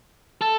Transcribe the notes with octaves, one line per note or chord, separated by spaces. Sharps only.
A4